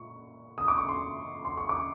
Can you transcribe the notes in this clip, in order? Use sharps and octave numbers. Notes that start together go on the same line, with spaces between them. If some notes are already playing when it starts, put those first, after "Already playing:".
Already playing: A#2 C#6
D#6
D6
C#6
C6
C6
C#6
D6